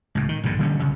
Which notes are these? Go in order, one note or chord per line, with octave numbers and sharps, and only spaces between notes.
C#2 A2
D#3
A#1 G2 D3
D3 G3 A3 C#4
C2 F2 C#3